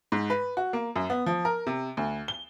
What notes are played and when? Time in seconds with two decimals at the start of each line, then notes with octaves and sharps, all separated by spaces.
0.12 G#2
0.30 B4
0.57 F#4
0.73 A#3
0.96 F#2
1.10 B3
1.26 F3
1.45 A#4
1.67 C3
1.97 D2
2.28 G7